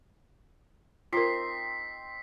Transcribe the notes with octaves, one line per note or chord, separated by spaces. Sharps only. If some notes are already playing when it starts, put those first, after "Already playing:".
C4 D#4 F4 A#4 C6 B6 C7